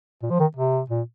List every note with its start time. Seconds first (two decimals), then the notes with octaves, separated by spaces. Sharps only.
0.22 A#2
0.31 F3
0.40 D#3
0.57 C3
0.90 A#2